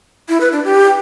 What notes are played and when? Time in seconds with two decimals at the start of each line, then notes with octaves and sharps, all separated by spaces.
0.29 E4
0.41 B4
0.52 D4
0.64 G4